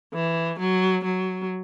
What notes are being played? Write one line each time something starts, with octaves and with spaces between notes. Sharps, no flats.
E3
F#3
F#3